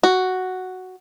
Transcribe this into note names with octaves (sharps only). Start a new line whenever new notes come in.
F#4